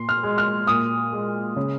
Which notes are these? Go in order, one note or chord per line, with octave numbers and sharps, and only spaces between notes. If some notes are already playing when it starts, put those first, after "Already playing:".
Already playing: A#2 C6
F6
G#3
F6
A#2 D#6
G#3
C#3